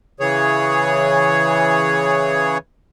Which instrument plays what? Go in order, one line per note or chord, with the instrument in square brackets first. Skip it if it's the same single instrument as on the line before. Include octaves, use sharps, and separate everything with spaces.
[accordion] C#3 E3 G#4 C#5